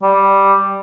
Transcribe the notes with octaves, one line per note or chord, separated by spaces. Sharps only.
G3